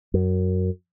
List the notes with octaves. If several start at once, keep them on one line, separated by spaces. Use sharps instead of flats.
F#2